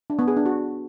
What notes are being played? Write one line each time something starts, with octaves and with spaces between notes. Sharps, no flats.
D4
B3
G#4
D4
F#4